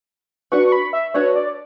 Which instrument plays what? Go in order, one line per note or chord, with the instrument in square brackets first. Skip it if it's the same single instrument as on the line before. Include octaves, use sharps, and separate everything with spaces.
[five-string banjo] D4 F#4 B4 [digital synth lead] C#6
[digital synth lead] C#6
B5
E5
[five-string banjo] D4 F#4 B4 [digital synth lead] C#5
[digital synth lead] D5